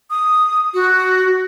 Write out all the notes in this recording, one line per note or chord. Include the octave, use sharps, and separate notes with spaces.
D#6
F#4